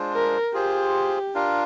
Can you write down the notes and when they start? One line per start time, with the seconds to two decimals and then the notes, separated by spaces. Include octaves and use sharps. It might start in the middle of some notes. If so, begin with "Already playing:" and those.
Already playing: G#3 D4 F4 C5
0.13 A#4
0.54 F4 G4 G#4 C5
1.34 D4 F4 A#4 F5